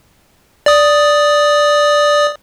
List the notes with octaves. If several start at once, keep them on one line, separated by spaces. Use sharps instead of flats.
D5 D#6